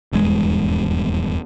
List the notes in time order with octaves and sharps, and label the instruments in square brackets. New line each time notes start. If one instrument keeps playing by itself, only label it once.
[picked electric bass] D#1 E2 G2 G#3